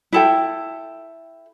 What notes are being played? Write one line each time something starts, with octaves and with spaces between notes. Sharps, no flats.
E4 A4 G5